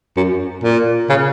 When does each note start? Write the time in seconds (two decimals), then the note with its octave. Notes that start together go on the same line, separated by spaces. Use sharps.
0.17 F#2
0.64 A#2
1.10 C#3